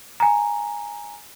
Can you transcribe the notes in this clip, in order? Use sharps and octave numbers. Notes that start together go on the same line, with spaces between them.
G#5 A#5